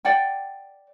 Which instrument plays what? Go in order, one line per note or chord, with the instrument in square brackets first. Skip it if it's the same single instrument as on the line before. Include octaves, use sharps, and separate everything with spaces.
[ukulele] D5 F#5 G5 A5